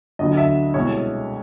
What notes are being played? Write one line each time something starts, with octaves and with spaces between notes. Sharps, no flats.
D2 D3 F#3 D#5
E5
C2 B2 G#3 C#5